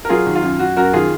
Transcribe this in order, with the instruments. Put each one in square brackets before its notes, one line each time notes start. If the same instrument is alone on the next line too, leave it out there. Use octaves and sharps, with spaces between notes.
[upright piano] A#4
F#3 F4 G#4
D#3
F4
F#2
F#2 F#4
F#2 F#4 A#4
D#3 F4 G#4